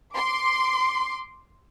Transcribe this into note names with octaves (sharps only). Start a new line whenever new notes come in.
C6 D6